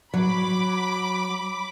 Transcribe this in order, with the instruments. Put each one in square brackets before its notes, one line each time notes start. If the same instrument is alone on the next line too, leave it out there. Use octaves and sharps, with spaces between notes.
[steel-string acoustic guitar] F#3 [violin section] B5 D6